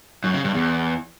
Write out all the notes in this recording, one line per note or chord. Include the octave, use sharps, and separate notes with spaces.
F#2
C#3
G2
E2